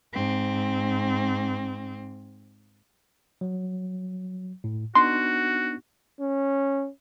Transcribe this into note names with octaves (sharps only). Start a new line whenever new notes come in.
G#2 C4
F#3
A2
B3 D4 D#4 F#4 C6
C#4